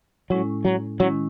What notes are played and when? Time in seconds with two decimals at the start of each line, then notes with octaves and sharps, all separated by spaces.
0.30 A2 F#3 G#3 C#4 E4
0.65 F#3
1.00 D#3 F#3 G#3 C#4 E4